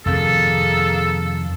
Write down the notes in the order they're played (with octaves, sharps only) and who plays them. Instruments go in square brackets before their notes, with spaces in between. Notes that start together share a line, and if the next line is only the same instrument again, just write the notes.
[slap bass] F2 C3 D#3 [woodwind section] A#3 G#4 A4